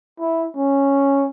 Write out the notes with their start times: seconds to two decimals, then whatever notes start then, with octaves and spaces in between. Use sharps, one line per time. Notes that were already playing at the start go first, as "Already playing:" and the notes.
0.19 E4
0.55 C#4